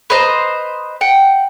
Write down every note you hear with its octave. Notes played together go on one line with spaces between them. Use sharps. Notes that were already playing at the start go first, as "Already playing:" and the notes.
B4 C5 D#5 A#5
F#5 G5